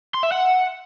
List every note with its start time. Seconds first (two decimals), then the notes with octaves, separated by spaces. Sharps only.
0.14 C6
0.23 E5
0.32 F#5